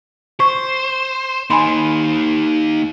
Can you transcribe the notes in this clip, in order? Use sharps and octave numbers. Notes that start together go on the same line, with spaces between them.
C5 C#6
A#3 D#4 G#5 B5 C6